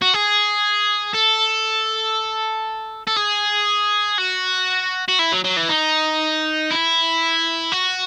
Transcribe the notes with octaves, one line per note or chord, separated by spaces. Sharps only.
F#4
G#4
A4
A4
G#4
F#4
F#4
E4
F#3
F#3
E3
D#4
E4
F#4